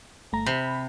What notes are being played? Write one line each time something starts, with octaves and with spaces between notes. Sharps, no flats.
G1 A3 A#5
C3 B5